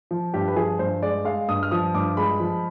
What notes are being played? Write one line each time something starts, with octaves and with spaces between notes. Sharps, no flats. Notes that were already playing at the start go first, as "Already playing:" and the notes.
F3
G2 G4
B4
F3 G#4
G2 C5
G#3 D5
G#3 F5
G2 D#6
F6
F3 D#6
G2 D6
G#3 B5
F3